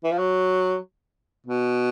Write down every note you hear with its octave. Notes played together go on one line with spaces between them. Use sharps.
E3
F3
F#3
B2